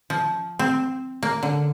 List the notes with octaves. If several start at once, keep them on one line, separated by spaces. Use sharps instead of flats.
F3
C4
A#3
D3